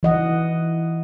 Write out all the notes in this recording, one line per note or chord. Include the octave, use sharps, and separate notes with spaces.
E3 D#5 F#5